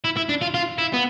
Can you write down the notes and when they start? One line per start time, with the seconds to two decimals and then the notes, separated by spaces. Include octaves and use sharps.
0.04 E4
0.17 E4
0.29 D4
0.41 F4
0.54 F4
0.78 E4
0.94 B3